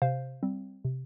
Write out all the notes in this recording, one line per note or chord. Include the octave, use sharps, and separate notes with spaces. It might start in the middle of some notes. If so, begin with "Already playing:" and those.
C3 C5 F5
G3 C4
C3